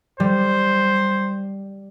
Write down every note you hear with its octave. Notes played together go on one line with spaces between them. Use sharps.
G3 C5